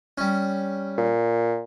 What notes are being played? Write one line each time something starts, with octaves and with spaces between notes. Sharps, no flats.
G3 C#4
A#2